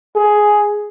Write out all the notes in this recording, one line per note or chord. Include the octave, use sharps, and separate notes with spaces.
G#4